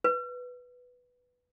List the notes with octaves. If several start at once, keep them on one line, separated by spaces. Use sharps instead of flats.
B4